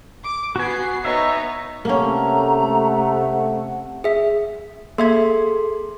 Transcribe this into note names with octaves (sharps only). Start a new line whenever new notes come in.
D6
B3 F#4 G#5 C7
B3 D#4 C#5 E5
C3 A3 A#3 C#4 F#5 A#5
G#4 E5
A#3 G#4 A4 E5 C6 G#6